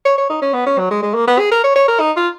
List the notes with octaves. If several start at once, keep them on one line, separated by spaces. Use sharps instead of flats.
C#5
C#5
D#4
C#4
B3
C#4
F#3
G#3
G#3
A#3
B3
G#4
A#4
C#5
C#5
A#4
D#4
F4